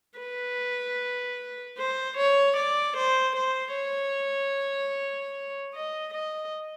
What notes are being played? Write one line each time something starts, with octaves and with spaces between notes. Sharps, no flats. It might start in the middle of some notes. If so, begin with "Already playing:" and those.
B4
C5
C#5
D5
C5
C5
C#5
D#5
D#5